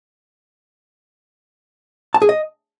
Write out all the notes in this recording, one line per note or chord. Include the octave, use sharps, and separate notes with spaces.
A5
G#4
D#5